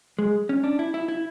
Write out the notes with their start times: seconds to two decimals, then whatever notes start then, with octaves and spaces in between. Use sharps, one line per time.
0.19 G#3
0.49 C#4
0.64 D4
0.79 E4
0.94 E4
1.08 E4